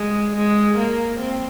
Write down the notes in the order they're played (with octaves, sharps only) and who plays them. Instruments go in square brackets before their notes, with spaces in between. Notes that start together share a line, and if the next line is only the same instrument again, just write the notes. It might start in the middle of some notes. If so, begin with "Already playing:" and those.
Already playing: [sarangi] G#3
G#3
A#3
C4